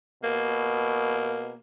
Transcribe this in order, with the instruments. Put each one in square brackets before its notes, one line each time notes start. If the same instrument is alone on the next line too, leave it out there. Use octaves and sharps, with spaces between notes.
[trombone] B2 [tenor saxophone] A#3